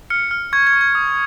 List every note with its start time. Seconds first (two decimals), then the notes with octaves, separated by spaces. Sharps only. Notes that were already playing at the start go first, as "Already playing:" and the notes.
0.10 F6 C#7
0.31 F6
0.53 C#6 G#6
0.67 G#6
0.73 C#6
0.81 G#6
0.95 D#6